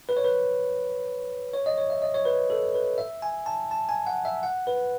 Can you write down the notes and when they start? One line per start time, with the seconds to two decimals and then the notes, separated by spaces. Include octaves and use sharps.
0.09 B4
0.17 C#5
0.25 B4
1.54 C#5
1.66 D#5
1.78 C#5
1.90 E5
2.02 D#5
2.14 C#5
2.25 B4
2.50 A4
2.75 B4
2.98 E5
3.22 G#5
3.46 A5
3.71 A5
3.89 G#5
4.07 F#5
4.25 E5
4.43 F#5
4.67 B4